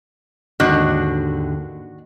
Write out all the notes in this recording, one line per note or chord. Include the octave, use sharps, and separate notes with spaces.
D#2 G#2 D3 D#3 D4 F#4